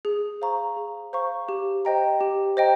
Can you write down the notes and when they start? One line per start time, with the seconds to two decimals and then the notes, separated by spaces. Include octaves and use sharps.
0.05 G#4
0.42 C5 F5 A#5 C#6
0.77 G#4
1.13 C5 F5 A#5 C#6
1.49 G4
1.85 C5 D#5 G5 A#5
2.21 G4
2.57 C5 D#5 G5 A#5